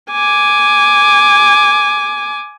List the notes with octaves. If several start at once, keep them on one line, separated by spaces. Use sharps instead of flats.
G#5 D6